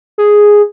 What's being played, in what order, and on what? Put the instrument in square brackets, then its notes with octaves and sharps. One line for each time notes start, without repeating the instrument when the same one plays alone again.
[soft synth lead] G#4